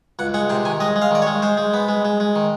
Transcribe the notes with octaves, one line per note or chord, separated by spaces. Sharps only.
C#2 F#5
G#3 F#5
C3 G5
D#3 G#5
G#3 D#5
G#3
F5
D#3 D5
C#5
G#3
G#3 C5
G#3
B3
G#3
G#3
G#3
D#3